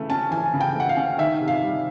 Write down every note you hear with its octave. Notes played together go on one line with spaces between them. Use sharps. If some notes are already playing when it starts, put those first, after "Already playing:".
Already playing: C#3 E3 A3
C#4 A5
E3 G#5
C#3
G5
A3 F#5
F5
C#4
D#3 E5
C3
F5
G3